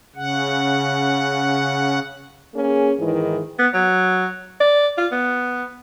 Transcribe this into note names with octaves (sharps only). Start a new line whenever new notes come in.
C#3 F#5
A#3 C#4 G#4
G#2 D#3 E3
B3
F#3
D5
F4
B3